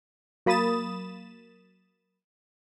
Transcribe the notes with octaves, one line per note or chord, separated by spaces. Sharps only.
F#3 A#3 B5 D#6 A6 E7